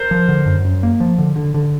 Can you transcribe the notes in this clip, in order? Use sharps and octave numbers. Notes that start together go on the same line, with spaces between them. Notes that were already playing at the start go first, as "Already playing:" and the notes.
Already playing: A#4 C5
F3
D3
F#2
F#2
A#3
F3
D3
D3
D3